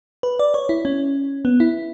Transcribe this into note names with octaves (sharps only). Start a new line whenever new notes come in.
B4
D5
C#5
E4
C#4
B3
E4